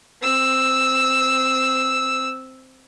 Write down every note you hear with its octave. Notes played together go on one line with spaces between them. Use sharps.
C4 E6